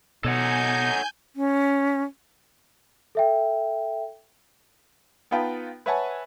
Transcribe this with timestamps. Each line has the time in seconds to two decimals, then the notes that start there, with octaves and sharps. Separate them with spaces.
0.24 B2 D#4 A4 C#5 F#5 G#5 G6
1.36 C#4
3.15 A4 E5 G5
5.31 B3 D#4 F4 B4 G5 A5
5.86 B4 C#5 E5 F#5 G#5 A5